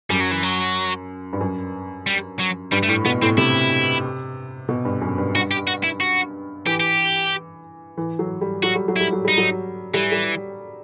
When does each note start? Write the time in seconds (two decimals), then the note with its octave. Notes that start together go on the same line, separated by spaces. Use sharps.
0.10 F#2 G3
0.20 F#3
0.31 E3
0.43 F#3
1.33 G2
1.41 F#2
2.07 G3
2.39 F#3
2.72 G2 G3
2.83 A3
2.88 A2 G3
3.05 B2 B3
3.22 A2 C4
3.38 C3 E4
4.69 B2
4.85 G2
5.02 F#2
5.18 G2
5.35 G2 F#4
5.51 G4
5.67 F#4
5.84 E4
6.00 F#4
6.66 E3 G4
6.80 G4
7.97 E3
8.19 F#3
8.41 G3
8.63 F#3 F#4
8.75 G3
8.88 F#3
8.96 G3 E4
9.13 F#3
9.25 G3 D#4
9.38 F#3
9.94 E3 G3
10.12 G3